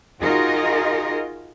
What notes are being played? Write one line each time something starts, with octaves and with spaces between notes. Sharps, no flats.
D#4 F4 F#4 G#4 A#4 D#5